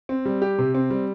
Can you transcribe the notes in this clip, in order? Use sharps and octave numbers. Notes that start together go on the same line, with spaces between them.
C4
G3
G4
C3
C4
G3